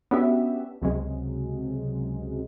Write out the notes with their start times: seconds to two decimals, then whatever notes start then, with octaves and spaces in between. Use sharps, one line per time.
0.11 B3 C#4 D4 F#4 G4 E5
0.82 C#2 C3 F#3 G#3